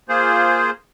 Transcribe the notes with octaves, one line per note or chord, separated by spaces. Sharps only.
A#3 F4 G#4 C5